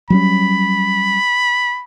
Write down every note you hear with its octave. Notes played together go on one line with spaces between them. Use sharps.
F#3 G3 C#4 B5